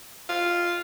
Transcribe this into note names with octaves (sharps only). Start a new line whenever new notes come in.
F4